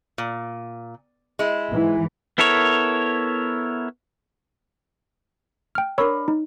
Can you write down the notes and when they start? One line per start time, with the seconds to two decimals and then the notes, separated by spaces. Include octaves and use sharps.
0.18 A#2
1.39 G#3 E4
1.71 G#2 E3
2.38 B3 E4 A4 A#4 C#5
5.75 G5 F6
5.98 D4 A#4 C#5 B5 C#6 E6
6.28 D#4